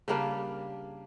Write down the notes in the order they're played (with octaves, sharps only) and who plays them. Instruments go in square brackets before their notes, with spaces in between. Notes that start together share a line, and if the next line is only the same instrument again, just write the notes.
[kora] C#3 G3 A#3 D4